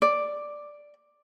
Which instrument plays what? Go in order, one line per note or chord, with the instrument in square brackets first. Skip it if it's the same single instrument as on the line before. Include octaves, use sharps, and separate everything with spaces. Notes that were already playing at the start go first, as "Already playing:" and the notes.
[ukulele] D5